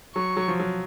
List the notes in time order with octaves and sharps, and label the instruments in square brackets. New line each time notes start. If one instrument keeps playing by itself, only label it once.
[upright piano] F#3 [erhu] C#6
[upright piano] F#3
F3
F#3